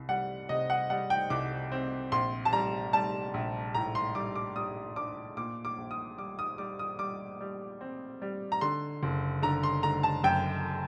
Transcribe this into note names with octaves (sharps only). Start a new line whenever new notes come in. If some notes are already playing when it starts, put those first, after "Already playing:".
Already playing: C2
G3 F#5
C3 D#5
F#5
G3 F#5
G5
C2 D6
C4
A#1 C6
A5
G3 A#5
G3 A5
A#1
A2 A#5
C6
G3 D6
D6
G3 D#6
D4 D6
A#2 D6
D6
A#1
D#6
G3 D6
D#6
G3 D6
D#6
G3 D6
G3
C4
G3
A#5
D3 C6
F#1
D3 A#5
C6
D3 A#5
A5
F#2 G5